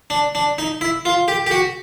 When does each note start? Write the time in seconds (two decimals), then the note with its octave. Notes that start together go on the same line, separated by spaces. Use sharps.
0.10 D4
0.35 D4
0.58 D#4
0.81 E4
1.05 F4
1.28 G4
1.47 G4
1.51 F#4